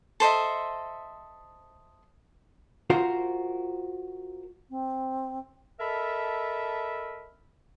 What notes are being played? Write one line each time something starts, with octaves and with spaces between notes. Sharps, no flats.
A4 C5 D#5 E5
F4 F#4 A#4 C5
C4
A4 A#4 D#5 E5 A5 B5